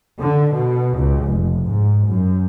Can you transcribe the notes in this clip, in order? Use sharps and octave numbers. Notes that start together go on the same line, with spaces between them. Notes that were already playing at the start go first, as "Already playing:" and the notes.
D3
B2
C#2
F1
G#2
F#2